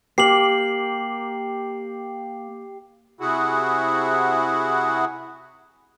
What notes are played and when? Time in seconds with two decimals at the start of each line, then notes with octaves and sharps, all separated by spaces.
0.18 A#3 G4 C7 F#7
3.20 C3 E4 F#4 G#4 F#5